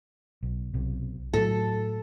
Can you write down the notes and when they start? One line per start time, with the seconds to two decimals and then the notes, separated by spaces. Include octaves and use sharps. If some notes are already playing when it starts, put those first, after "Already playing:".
0.43 B1
0.74 B1 C3
1.34 A2 F#3 A4